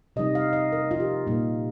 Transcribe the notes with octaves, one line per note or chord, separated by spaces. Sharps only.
C3 G3 D#4 D#5
F5
D#5
A#4
F4
G4
A#2 G3 A#3 D#4 F4